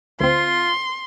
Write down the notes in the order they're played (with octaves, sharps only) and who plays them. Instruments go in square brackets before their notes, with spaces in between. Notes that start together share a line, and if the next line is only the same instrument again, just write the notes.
[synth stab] D2 C4 [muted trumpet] F4 [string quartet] C6